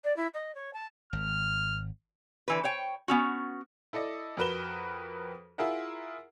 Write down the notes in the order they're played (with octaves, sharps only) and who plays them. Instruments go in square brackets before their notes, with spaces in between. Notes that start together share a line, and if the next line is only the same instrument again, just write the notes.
[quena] D5
E4
D#5
C#5
A5
[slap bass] G#1 [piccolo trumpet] F6
[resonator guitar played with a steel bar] D3 E3 B4
C5 C#5 G5
B3 C#4 F#4
[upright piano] E4 A4 D5 D#5
F2 F#4 A#4 B4 E7 G7
E4 F4 G#4 A#4 E5 F#5